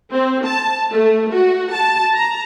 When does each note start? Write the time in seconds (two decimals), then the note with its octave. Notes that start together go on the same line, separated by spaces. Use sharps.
0.13 C4
0.46 A5
0.91 A3
1.32 F#4
1.73 A5
2.14 A#5